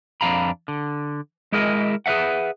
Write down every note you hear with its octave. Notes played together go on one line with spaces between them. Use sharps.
F2 D4 F5 A#5 B5
D3
G#3 E4 G#4 A#4 D#5
G#4 B4 C#5 E5 F#5